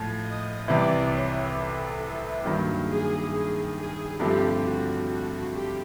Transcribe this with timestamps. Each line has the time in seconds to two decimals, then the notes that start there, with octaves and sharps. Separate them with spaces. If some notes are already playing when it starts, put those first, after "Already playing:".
Already playing: A2 F3
0.25 D#5
0.68 C2 C3 E3 D5
1.12 C#5
1.56 A4
2.43 G2 D#3 F#3 A#3
2.88 G#4
3.32 G#4
3.76 G#4
4.20 G2 D3 F3 A3 C4 G4
4.63 F#4
5.08 F#4
5.52 G4